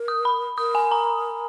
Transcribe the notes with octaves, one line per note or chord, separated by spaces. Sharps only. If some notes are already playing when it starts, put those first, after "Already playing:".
Already playing: A#4
D#6
B5
A#4 D#6
G#5
A#5